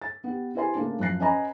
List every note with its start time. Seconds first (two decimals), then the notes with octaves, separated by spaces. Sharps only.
0.02 A6
0.24 B3 G4
0.55 E4 G4 B4 C5 G#5 C6
0.75 C#3 A3 A#3 D4
0.99 F#2 F3 F#6 C7
1.20 C#4 B4 D#5 G#5 A#5 B5